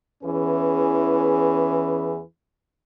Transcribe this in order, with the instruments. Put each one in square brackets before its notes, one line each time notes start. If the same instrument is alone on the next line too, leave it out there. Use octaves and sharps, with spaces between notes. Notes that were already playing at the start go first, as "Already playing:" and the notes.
[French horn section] E2 E3 C#4 G#4 B4